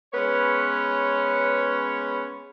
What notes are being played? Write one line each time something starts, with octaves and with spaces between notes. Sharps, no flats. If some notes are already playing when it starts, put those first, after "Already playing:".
G#3 B3 C#4 B4 C#5